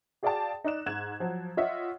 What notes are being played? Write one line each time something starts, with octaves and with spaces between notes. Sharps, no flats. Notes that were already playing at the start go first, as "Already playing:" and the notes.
F#4 G#4 D5 F5 G5 A5
D#4 D5 F#6 E7
G#2 F#6 G#6 E7
F3 F#3
F4 C#5 D#5 E5 F#5